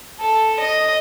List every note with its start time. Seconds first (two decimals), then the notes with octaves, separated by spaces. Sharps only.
0.20 A4
0.60 D#5